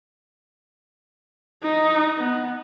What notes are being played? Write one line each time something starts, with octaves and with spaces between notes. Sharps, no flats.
D#4
B3